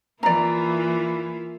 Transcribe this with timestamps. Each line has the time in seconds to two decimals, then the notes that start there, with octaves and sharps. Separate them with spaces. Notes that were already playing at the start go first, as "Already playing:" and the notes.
0.23 E3 A#3 E4 F4 D5 A#5